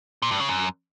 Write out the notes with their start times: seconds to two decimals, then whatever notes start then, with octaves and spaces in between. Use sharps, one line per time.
0.22 A#2
0.31 G2
0.40 C#3
0.49 F#2